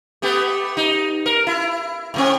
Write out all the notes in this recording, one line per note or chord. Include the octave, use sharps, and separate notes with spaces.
A3 B3 G4
D#4
A#4
E4
A2 F#3 C4